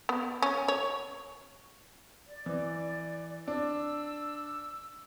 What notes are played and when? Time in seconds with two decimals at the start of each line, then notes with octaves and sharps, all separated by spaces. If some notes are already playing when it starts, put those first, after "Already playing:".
0.09 B3
0.42 C#4
0.68 C#5
2.27 D5
2.46 E3
3.48 D4 E6